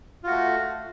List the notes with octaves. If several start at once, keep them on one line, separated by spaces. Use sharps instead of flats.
A3 F4 F#4